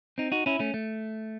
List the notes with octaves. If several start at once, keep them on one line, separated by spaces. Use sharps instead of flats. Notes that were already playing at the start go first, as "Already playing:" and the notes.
C4 D#4
D#4 F#4
C#4 E4
A3 C#4
A3